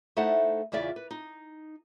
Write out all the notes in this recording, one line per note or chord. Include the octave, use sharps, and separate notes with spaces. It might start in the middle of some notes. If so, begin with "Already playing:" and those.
A3 D#4 E4 A4 C5 F#5
E2 C#3 E4 F4 D5 E5
B4
D#4